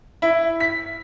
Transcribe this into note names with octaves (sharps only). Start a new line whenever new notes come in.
E4
B6